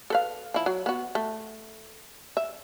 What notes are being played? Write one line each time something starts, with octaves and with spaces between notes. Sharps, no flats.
A4 B4 F5
F3 E4
F#3
B3 F#4
A3
E5